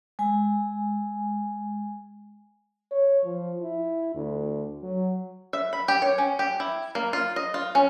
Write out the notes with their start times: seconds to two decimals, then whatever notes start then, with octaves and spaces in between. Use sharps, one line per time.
0.19 G#3 G#5
2.91 C#5
3.25 F3
3.62 E4
4.15 D2
4.83 F#3
5.53 E5
5.73 B5
5.88 G4
6.02 C#5
6.18 C#4
6.39 G4
6.60 E4
6.95 A#3
7.13 F4
7.36 D#5
7.54 F4
7.75 C#4